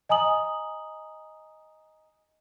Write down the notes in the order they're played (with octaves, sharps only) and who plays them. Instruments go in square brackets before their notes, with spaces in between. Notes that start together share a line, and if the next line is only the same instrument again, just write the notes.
[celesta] D#5 G#5 A#5 D#6 F#7